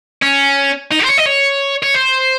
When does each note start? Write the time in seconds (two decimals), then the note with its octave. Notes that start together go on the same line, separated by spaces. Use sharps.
0.23 C#4
0.92 D#4
1.00 F#4
1.04 C5
1.09 C#5
1.18 D#5
1.26 C#5
1.83 C#5
1.94 C5